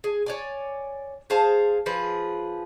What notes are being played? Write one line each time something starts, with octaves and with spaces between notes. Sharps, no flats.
G#4
C#5 D5 G#5
G#4 C5 F5 A5
F3 G#4 B4